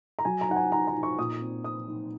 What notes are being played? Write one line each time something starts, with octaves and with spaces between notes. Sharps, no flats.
A#5
F#3 G#5
A#5
D#4 F#5
G#5
D#4 A#5
A#5
D#4
C#6
A#2 D#6
C4
C4 D#6
D#4